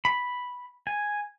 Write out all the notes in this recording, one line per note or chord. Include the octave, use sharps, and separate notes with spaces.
B5
G#5